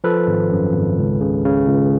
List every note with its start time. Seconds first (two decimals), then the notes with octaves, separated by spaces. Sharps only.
0.04 F3 A4 B4
0.27 G#1
0.51 F#2
0.74 G#1
0.98 C#2
1.20 C#3
1.45 C#3
1.67 C#2